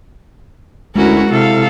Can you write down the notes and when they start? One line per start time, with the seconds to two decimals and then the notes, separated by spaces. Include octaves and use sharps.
0.96 D2 G#3 C#4 E4 F#4 A#4
1.31 C3 E4 A4 F5